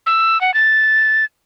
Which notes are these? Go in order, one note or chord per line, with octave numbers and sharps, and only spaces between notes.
E6
F#5
A6